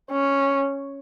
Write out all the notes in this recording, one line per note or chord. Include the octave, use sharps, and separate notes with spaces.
C#4